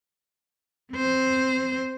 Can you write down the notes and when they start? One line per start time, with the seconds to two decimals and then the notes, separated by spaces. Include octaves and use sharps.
0.93 C4 C5